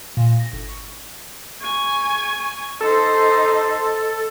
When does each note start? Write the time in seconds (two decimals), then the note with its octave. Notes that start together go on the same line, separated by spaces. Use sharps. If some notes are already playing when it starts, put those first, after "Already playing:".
0.17 A#2
0.40 A#6
0.53 G1
0.69 C#6
1.61 G#5 C#6
2.81 D#4 A4 C5